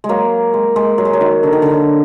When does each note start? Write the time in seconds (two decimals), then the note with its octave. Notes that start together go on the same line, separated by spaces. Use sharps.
0.04 G#3
0.09 F#3 A#3
0.54 G#3
0.76 G#3
0.98 F#3
1.05 G#3
1.13 F#3
1.21 D#3
1.43 D3
1.52 D#3
1.62 D3